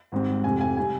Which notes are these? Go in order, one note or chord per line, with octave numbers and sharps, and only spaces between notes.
G#1 G#2 G3 C4
F1 F2 C3 G#5
G#5
C3 G3 C4 G#5